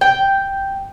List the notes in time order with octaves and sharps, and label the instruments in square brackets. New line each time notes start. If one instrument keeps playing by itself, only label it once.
[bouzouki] G5